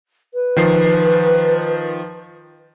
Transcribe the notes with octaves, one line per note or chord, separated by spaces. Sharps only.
B4
D#3 F3 C7